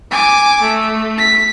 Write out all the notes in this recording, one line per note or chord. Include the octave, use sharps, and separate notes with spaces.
G#5 D6
A3
B6